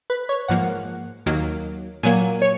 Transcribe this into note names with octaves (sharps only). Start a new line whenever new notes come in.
B4
C#5
G#2 F3 A#3 F#5
D#2 D#3 F#3 A#3
A#2 F#3 A#3 G#5
C#5